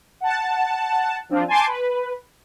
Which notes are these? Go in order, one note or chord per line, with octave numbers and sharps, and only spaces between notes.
F#5 A5
F3 C4 D4 F4
G#5 A5 C6 D6 G6
B4